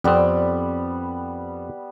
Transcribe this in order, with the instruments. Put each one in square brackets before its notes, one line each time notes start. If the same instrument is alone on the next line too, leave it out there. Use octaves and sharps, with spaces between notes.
[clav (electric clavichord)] F2 C4 [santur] G3 B3